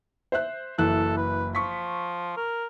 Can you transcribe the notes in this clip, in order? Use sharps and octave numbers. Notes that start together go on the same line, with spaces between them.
C5 E5 F#6
F#1 E3 A4 F#6
B4
F3 C#6 B6
A#4